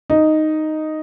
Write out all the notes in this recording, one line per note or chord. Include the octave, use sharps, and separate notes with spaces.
D#4